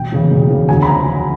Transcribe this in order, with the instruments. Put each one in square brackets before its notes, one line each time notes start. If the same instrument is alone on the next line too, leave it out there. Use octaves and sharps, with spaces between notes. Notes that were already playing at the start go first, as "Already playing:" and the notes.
Already playing: [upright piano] E1 G5
E2 C#3
E1
E2 C#3
D2 G#5
B5
F3 A#5